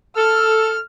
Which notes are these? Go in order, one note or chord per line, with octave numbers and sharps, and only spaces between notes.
A4 F6